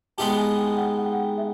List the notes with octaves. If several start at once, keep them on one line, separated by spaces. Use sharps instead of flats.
G#3 B3 D#4 G4 A5
G#5
G5
F#5
F#5
G5
F#5
E5